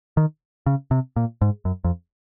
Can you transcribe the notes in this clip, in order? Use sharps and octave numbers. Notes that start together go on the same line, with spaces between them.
D#3
C#3
C3
A#2
G#2
F#2
F2